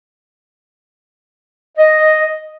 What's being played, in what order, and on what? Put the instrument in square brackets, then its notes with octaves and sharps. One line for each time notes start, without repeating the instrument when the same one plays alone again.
[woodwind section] D#5